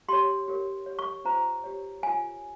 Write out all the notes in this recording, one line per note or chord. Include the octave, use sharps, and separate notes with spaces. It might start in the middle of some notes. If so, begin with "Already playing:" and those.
G4 C#5 C6
G4 A#4 C#5
G4 C#5
C#6
C#4 F4 C5 A#5
G4 C#5
F4 A#4 C#5 G#5